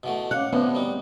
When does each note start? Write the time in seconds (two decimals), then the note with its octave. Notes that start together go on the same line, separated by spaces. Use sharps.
0.03 B2 E3 A3 F#5
0.31 C#4 C#5 F5 F#5 D6
0.53 D2 A2 F3 B3 C4
0.75 G3 D#4